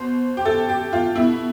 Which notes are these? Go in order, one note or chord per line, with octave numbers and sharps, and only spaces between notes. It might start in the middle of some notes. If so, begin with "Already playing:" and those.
Already playing: B2 C5
G4
A4
G4
F4
B2 E4